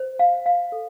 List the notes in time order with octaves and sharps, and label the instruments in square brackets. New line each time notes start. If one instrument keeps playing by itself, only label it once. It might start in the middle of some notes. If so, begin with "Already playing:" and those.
Already playing: [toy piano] C5
F5
F5
A4